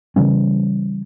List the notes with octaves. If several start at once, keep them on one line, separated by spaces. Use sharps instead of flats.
C#3 E3 G3 C#4